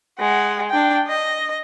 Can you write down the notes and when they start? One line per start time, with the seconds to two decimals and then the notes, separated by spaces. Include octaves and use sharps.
0.19 G#3 F#5
0.70 D4 G5
1.08 D#5